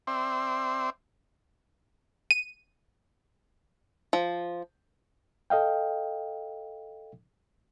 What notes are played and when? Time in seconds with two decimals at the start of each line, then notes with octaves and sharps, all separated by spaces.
0.07 C4 D5 E5 G5 C6
2.31 D#7
4.13 F3
5.50 A4 D#5 F5 G5